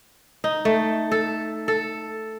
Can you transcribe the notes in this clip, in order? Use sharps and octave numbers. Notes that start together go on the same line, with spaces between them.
D#4
A3
A4
A4